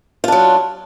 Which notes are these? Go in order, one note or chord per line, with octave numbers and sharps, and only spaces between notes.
F#3 D4 F4